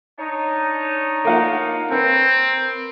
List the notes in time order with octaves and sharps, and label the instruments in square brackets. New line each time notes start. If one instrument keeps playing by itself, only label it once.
[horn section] D4 D#4 C#5
[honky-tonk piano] A#3 F4 F#5
[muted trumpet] C4 [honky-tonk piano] A#4 B4